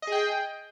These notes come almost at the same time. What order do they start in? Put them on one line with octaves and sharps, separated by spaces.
D#5 G#4 G5